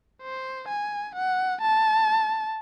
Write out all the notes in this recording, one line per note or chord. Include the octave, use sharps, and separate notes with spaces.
C5
G#5
F#5
A5